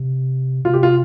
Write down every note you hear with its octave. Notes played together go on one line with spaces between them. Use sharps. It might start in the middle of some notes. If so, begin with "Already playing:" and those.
Already playing: C3
C3 F4
G4
F4